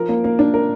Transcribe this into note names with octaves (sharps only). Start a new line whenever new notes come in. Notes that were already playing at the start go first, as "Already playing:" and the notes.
Already playing: F3 A#4
A#3
A#3
D4
A#4